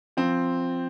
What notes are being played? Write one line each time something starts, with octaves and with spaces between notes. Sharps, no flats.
F3 C4